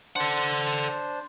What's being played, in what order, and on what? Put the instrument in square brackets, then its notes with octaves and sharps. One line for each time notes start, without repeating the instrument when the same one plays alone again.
[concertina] D4 C5 [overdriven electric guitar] A4 F#5